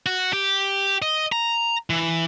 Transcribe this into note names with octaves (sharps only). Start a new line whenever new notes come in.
F#4
G4
D#5
A#5
E3